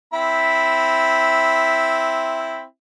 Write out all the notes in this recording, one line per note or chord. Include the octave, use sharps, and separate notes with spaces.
C4 E4 B5